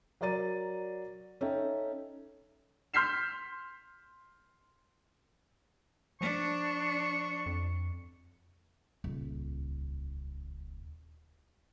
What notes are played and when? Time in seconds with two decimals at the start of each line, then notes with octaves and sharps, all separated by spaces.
0.21 F#3 A#4 D5 A#5 A6 D#7
1.41 C#4 D#4 A4 E5 G5
2.94 C6 F6 G6 B6 C7 E7
6.21 F3 D4 C#6
7.46 F2
9.04 D#1 C#2